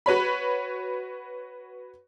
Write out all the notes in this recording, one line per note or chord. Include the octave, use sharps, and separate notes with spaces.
F#4 B4 C#5 B5